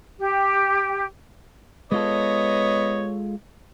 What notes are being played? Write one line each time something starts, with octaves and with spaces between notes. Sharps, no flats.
G4
G#3 B3 F4 A4 C#5 D#5